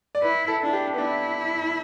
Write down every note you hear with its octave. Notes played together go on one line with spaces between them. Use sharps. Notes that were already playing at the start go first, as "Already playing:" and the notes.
D5
E4 B4
A4
D4 E4
G4
B3
D4 E4